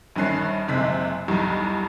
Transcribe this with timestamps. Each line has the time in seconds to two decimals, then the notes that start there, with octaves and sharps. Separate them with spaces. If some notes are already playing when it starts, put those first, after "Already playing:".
0.16 A#1 G2 D#3 C#4 F#6 C7
0.68 F#1 C3 G#3 B6
1.28 B1 E2 G2 G4